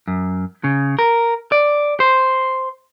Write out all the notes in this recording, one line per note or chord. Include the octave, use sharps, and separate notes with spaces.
F#2
C#3
A#4
D5
C5